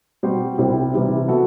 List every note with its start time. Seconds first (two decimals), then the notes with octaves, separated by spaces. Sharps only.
0.23 B2 G3 C4 F#4 C5
0.58 C2 C3 G3 C4 E4
0.93 C3 E3 G3 B3 E4
1.28 F#3 B3 F#4 A4